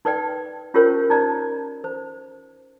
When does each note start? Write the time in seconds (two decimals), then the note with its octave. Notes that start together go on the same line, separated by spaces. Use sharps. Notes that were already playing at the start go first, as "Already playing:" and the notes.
0.05 D#4 B4 D5 G5
0.74 C#4 F4 G4 A#4 C5 C#5
1.10 D#4 C5 D5 A#5
1.84 C5